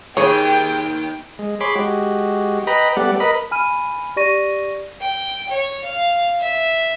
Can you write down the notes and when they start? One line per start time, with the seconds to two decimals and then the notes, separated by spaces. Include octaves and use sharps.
0.17 D#2 G#4 C#5 G5
1.39 G#3
1.60 G#4 C#5 B5 C6 D6
1.75 G#3 F#4 G4
2.67 B4 D#5 G5 A#5 B5
2.97 G3 A3 B3 G4 D5 F#5
3.20 A#4 B4 D#5 B5
3.51 G#5 B5 F6 D#7
4.16 G4 D5 C#6 A#6 D#7
5.01 G5
5.50 C#5
5.84 F5
6.40 E5